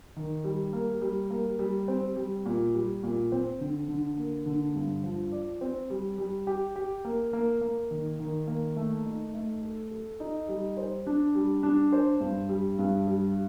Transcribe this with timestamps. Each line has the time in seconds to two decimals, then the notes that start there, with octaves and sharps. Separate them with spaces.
0.16 D#3
0.44 G3
0.73 A#3
1.01 G3
1.30 A#3
1.59 G3
1.88 C4
2.16 G3
2.45 A#2
2.74 G3
3.03 A#2
3.32 C4
3.60 D3
3.89 D3
4.17 A#3
4.46 D3
4.75 G2
5.03 F3
5.32 D5
5.61 C4
5.90 G3
6.18 G3
6.47 G4
6.76 G4
7.05 A#3
7.33 A#3
7.61 A#3
7.91 D#3
8.20 D#3
8.47 A#3
8.76 A3
9.05 D#4
9.34 A3
9.62 A4
9.91 A4
10.20 D#4
10.48 G3
10.77 C5
11.07 D4
11.35 G3
11.63 D4
11.92 C5
12.20 G2
12.49 G3
12.79 G2
13.07 G3